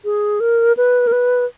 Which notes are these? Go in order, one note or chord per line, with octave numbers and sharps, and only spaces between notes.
G#4
A#4
B4
A#4
B4